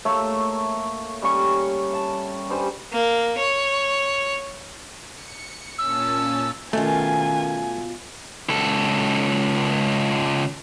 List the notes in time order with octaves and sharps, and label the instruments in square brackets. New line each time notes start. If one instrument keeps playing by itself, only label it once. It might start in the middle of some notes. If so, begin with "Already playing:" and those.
[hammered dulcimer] A3 A#3 C#5 E5
G3 C#4 C#6
A5
G2 G3 C5 G#5
[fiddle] A#3
C#5
[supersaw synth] C#7
[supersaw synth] A#2 C#4 A5 [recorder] E6
[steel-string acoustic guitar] B2 F4 [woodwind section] D#3 C#4 [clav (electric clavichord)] A3 [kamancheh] G#5
[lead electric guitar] C#2 A4